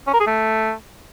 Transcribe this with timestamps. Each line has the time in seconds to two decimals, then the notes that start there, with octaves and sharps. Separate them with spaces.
0.07 C#4
0.14 A#4
0.20 G#4
0.27 A3